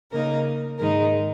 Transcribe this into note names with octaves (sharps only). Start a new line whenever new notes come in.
C#3 A#3 D#4 A#4
G#2 D#3 G#3 D#4 A#4